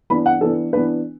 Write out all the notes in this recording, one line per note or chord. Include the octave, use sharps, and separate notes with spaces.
E3 B3 D4 B5
F#5
E3 B3 D4 A4
E3 B3 D4 B4